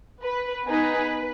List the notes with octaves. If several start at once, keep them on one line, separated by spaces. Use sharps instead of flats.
B4
B3 D#4 G#4 B4